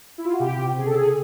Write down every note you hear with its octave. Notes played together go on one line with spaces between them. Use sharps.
E4
F4
F#4
C3 G4
C3
C#3 G#4
A4
C#3 G#4